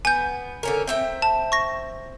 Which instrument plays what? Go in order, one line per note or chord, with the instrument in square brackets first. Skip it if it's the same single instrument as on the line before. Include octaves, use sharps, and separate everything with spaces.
[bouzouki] B3 [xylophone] G#5 G6
[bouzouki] D3 C#4 A#4
C4 E5 G5
[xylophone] A5
C#6 A#6